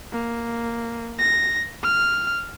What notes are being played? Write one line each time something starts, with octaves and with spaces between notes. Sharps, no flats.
A#3
A#6
F6